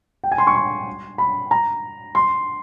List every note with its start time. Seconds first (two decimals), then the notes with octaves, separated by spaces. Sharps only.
0.24 G5
0.32 G#5
0.38 C6
0.47 C#6
0.55 C6
1.18 B5
1.51 A#5
2.15 C6